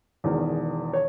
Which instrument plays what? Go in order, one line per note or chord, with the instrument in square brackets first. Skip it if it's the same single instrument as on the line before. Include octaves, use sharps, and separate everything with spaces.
[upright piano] E1 E2 D#3
C#5